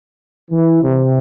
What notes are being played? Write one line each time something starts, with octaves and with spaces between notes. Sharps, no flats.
E3
C3